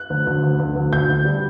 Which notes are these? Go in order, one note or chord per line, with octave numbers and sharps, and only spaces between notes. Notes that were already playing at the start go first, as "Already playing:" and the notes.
Already playing: F#6
D2
D2
D2
D2
D2
D2 G6
D2
G3